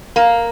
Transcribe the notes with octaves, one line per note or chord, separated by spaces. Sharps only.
A#3